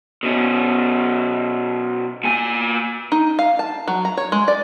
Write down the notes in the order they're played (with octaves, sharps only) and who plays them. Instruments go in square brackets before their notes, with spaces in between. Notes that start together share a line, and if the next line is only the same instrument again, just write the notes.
[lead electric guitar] B2 C#4
A#2 G#5
[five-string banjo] D#4
F5
A5
F#3
A#5
C#5
G#3
D5